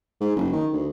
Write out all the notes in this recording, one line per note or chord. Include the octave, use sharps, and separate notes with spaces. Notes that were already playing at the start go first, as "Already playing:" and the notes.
G#2
F#1
D#3
D2